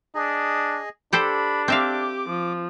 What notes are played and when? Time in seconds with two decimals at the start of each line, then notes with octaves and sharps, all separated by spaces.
0.15 D4 G#4 D#5
1.13 D4 G4 A4 C5 B5
1.68 C4 G4 E5 F5 D6
2.29 F3